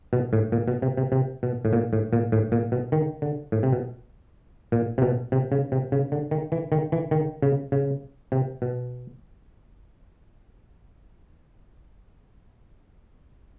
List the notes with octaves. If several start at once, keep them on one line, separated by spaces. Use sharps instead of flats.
B2
A2
A#2
B2
C3
C3
C3
B2
A2
A#2
A2
A#2
A2
A#2
B2
D#3
D3
A2
C3
B2
A#2
C3
B2
C3
C#3
C3
C#3
D3
D#3
E3
D#3
E3
D#3
C#3
C#3
C3
B2